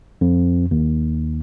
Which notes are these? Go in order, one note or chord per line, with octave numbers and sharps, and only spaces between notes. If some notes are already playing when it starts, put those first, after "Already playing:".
F2
D#2